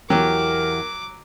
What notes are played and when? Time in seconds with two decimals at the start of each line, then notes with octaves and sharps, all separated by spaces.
0.10 E2 F#3 G4 A#4 D6